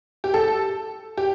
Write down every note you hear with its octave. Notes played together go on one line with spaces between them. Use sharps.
G4
A4
G4